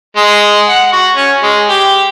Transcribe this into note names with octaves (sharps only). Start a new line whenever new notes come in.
G#3
F#5
F#4
C#4
G#3
G4